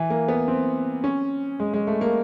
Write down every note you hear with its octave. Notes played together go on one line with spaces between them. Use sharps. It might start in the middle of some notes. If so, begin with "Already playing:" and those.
Already playing: E3
A#3
B3
C4
C#4
G#3
G#3
A3
A#3